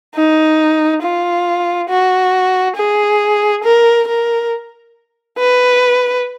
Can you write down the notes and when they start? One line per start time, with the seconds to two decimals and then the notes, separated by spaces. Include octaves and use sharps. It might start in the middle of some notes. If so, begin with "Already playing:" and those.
0.15 D#4
1.02 F4
1.89 F#4
2.76 G#4
3.64 A#4
4.08 A#4
5.38 B4